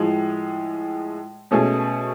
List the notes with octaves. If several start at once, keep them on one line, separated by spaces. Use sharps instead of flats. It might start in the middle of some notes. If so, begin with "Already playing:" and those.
Already playing: A2 F3 G#3
B2 A3 C#4 G#4